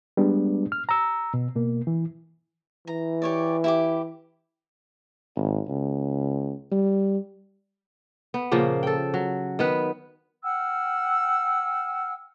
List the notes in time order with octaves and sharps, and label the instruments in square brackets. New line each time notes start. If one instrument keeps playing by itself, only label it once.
[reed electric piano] G3 G#3 B3 D4
F6
A#5 E6
B2
B2 A#3
E3
[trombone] E3 [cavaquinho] A#5
[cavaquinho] G4 C#5 D5
E4 G4 D6
[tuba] G#1
C#2
G3
[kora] B3
A#2 C#3 F3 A#3
A4 G5
F#3
D#3 B3 B4
[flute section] F#5 G5 E6 F6